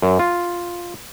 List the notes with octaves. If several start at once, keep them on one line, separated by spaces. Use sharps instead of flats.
F#2
F4